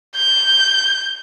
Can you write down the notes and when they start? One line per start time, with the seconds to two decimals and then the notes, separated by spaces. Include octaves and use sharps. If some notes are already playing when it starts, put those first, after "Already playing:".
0.16 G6